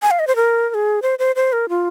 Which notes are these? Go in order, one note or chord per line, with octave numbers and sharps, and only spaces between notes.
G#5
F5
D#5
C5
A#4
A#4
G#4
C5
C5
C5
A#4
F4